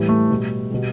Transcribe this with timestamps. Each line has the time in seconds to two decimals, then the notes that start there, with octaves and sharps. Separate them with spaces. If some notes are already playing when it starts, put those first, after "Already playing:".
Already playing: A2 E3 G3
0.09 A3
0.30 B2 G3
0.70 B2 G3